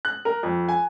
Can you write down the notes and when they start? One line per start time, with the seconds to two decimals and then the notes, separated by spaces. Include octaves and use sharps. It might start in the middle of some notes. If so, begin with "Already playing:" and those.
0.05 F#6
0.25 A#4
0.43 F2
0.69 G#5